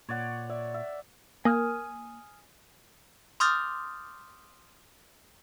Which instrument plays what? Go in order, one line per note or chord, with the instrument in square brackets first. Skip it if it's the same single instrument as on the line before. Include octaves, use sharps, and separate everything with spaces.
[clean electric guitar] A#2 [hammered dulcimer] C#5 D5 F#5
[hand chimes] D5 [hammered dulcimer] E5
[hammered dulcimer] E5
[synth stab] A#3 [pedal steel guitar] G#5 D#6 F6
[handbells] C6 D6 D#6 F6 G6 A6